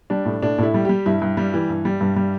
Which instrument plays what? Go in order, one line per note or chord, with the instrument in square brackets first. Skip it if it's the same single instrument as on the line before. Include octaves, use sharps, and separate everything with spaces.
[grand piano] G3 D4
A2
A2 D4
A2 E4
G3
G3 G4
G2 E4
G2
G3
E3
G2
G3
G2
G3